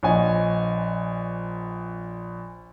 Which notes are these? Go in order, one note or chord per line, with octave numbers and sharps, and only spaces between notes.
A#1 C#5 D#5 F#5 G#5